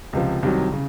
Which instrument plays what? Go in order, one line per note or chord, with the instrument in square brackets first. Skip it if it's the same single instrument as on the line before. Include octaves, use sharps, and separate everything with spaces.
[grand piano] C#2 C3 F3
C2 C3 D#3 F#3
C#3